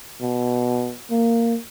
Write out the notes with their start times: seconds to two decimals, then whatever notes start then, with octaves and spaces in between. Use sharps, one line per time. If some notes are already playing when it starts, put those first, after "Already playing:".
0.21 B2
1.11 A#3